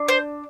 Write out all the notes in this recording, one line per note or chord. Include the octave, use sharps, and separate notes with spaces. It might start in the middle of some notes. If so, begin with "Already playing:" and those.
Already playing: D4
C5